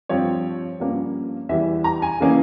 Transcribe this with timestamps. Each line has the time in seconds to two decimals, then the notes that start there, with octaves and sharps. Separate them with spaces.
0.09 G2 F3 C4 C#5
0.80 G2 F3 A#3 C#4
1.49 E2 E3 G3 E5
1.84 A#5
2.02 G#5
2.20 C#3 E3 A#3 C#4